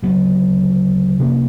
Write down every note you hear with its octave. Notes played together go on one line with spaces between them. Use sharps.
D2 C#3 F#3 B3
C3 F3 A#3 D4